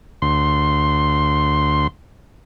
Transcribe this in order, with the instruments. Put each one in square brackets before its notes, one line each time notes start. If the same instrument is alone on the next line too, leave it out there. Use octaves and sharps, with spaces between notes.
[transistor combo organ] D2 C6